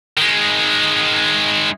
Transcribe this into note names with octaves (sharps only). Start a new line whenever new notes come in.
D#3 G#3